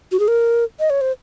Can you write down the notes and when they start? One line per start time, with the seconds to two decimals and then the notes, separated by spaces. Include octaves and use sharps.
0.12 F#4
0.20 G#4
0.28 A#4
0.80 D#5
0.90 C#5
1.01 C5